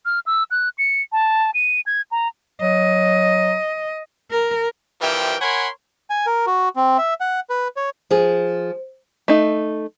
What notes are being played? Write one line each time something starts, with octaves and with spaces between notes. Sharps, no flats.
F6
E6
F#6
C#7
A5
D#7
G#6
A#5
F#3 D#5
A#4
C3 E3 F3 G3 A#4 G5
A#4 C#5 F#5 G#5 B5 C6
G#5
A#4
F#4
C4
E5
F#5
B4
C#5
F3 G#4 C5
A3 D#4